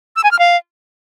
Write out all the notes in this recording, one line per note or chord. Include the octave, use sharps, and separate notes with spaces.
E6
G#5
F6
F5